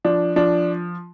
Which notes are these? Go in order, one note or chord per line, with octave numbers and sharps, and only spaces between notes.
F3 D4
F3 D4